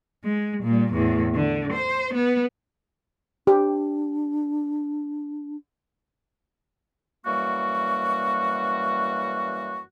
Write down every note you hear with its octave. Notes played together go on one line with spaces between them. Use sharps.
G#3
A#2 G3
E2 A2
D3
C5
B3
D4 G4
F#2 E3 G3 A#3 F#4 C#6